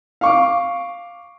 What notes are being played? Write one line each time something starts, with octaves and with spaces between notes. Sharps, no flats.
F5 C#6 D6